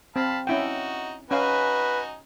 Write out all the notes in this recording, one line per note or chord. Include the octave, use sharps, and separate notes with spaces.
C4 F5 A5 B5
C#4 D#4 E4 F#4 G5
C#4 D#4 F#4 B4 F5 G#5